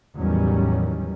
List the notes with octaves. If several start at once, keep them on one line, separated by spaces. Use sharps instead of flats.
A1 E2 D#3 F#3 G3 C#4